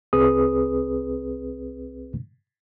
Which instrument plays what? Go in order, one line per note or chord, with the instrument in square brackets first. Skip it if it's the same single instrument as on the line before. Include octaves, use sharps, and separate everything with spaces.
[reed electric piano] C2 C4 G#4 B4 D#6